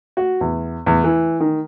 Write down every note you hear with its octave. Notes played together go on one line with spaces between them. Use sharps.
F#4
E2
E2
E3
D#3